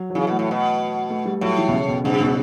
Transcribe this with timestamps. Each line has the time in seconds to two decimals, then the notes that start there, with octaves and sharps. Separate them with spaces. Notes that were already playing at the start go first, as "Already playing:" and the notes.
Already playing: F#3
0.10 F#3
0.15 C#3 E3
0.27 B2 A3
0.39 A2
0.51 B2
1.10 A3
1.25 G3
1.41 A2 F#3
1.57 E3
1.68 B2
1.72 C#3
1.88 B2
2.04 G2 C#3
2.21 B2